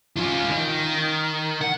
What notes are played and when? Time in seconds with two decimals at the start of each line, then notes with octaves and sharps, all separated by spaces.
0.16 C#4 F4
0.48 D#3
1.61 F#5